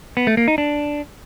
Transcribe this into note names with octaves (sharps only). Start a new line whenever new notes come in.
B3
A3
A#3
D#4
D4